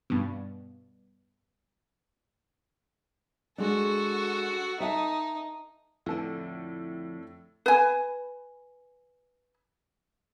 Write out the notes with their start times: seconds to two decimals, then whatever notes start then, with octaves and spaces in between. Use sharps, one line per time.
0.10 G2 B2
3.58 G#3 D4 F#4 A4
4.80 D#4 E5 F#5 A5
6.06 F2 A2 D3 A4
7.66 B4 G#5